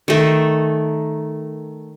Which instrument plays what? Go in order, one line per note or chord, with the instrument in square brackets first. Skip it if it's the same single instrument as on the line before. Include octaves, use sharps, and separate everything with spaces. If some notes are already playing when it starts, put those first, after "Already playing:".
[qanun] D#3 A3